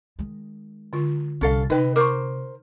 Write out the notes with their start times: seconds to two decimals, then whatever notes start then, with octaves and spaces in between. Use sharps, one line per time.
0.19 D#3 G#3
0.93 D3 F4
1.41 C2 C#4 A4 F5
1.70 C3 D#4 B4 D#5 G5
1.96 A#4 C5 C#6 D6